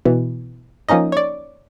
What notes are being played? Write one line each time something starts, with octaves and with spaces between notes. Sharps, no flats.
B2 E3
F3 A#3 C#4 D#4 D#5
C#5 D5